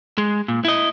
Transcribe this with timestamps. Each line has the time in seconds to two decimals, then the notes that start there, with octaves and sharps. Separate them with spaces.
0.18 G#3
0.48 A#2
0.65 E4 D#5